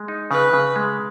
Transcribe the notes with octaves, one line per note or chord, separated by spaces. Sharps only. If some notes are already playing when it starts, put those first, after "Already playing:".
Already playing: G#3
D#4
C#3 B4
C#3
G#3